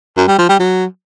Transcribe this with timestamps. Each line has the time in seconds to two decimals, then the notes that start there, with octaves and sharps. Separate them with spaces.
0.17 F#2
0.28 G3
0.38 F3
0.49 G3
0.60 F#3